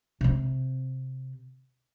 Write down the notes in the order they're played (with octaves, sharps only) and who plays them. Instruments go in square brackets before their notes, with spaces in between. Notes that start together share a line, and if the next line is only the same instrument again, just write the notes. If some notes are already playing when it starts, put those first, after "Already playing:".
[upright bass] C3 C4